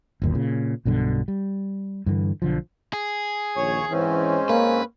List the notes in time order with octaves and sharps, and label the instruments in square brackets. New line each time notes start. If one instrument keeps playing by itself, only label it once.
[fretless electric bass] G1 D#2 A#2
A#2 C#3
B1 G2 B2 D3
G3
G2 D3 E3
B1 D3 F3
[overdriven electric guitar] G#4
[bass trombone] A#1 [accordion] D#2 C#5 C#6
[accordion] G#2 C4 C#4 [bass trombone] E3
[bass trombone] A#3 [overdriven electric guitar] B4